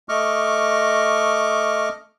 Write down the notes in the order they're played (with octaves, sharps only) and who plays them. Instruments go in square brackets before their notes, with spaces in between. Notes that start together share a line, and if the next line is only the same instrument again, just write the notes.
[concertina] A3 D#5 C#6 D6 F6